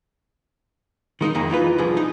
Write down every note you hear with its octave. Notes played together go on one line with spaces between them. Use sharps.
D#3 G#3 A3 D#4
F2 D#3 A#3 G#4
E3 D#4 F4 B4
C2 D3 F3 G#4
D#4